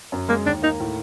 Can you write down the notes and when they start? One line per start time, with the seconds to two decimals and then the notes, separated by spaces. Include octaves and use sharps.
0.12 F#2
0.28 G#3 A#3
0.45 D#2 D4
0.62 A#3 D#4
0.80 A2